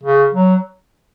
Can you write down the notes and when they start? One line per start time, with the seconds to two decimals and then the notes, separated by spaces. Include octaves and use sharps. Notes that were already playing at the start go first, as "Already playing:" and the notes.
0.03 C#3
0.33 F#3